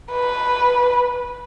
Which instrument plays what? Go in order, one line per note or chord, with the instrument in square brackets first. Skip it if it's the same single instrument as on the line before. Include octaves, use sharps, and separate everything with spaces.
[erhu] B4